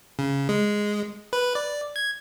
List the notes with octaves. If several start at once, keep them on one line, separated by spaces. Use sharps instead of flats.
C#3
G#3
B4
D5
G#6